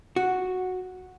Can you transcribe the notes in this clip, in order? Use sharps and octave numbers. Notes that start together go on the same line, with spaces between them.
F#4